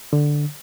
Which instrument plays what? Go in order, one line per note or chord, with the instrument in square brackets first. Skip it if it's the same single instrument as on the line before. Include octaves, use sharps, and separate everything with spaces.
[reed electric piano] D3